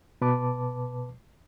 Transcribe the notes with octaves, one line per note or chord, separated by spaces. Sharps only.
B2 B4 A5 D6